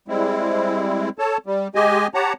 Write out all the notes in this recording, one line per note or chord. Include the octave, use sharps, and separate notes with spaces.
G3 G#3 C4 E4
A4 C#5 A5
G3
G#3 G4 D#5 G#5
G4 C#5 F#5 A5 A#5